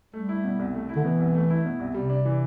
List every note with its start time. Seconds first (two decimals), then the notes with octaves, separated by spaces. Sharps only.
0.13 G3 A3
0.29 E4
0.44 B2
0.59 C2
0.74 A3
0.89 E4
0.96 D3
1.04 B2 E3
1.19 C2
1.34 A3
1.50 E4
1.65 B2
1.80 C2
1.94 C3 G3
2.10 D4
2.25 E3